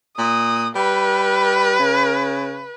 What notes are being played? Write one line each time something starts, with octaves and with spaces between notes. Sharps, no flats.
A#2 D#6
G3 B4
C#3